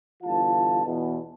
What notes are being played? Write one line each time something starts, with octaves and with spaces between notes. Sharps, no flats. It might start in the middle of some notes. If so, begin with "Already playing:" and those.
G1 E3 F4 F5 A5
E2 B2